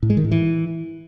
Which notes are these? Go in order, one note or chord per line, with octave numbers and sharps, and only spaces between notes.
A2
G#3
D#3
A2
E3